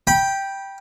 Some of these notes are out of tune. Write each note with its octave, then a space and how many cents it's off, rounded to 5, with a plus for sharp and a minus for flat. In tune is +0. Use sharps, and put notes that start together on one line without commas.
G5 +0 B5 -25